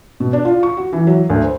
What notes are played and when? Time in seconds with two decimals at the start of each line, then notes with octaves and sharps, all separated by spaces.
0.20 B2
0.33 D4
0.45 F4
0.63 C#6
0.77 F#4
0.93 E3
1.07 F#3
1.30 D2
1.44 C5